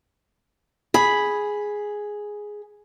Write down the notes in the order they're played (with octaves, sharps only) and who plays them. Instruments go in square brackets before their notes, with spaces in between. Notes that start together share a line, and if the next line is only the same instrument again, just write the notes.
[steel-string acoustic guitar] G#4 [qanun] B5